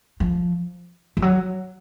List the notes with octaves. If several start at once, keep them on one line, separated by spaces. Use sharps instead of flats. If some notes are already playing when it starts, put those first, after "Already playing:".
F3
F3
F#3